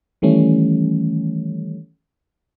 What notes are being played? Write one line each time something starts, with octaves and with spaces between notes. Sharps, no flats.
D#3 E3 G3 A3 C#4